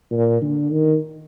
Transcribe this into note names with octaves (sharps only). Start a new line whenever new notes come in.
A#2
D3
D#3